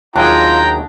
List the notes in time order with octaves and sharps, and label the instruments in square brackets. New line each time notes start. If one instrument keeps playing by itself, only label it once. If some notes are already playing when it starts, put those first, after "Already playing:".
[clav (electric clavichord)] D#2 F#3 G#4 [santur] D4 [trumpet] F4 [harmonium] G5 A#5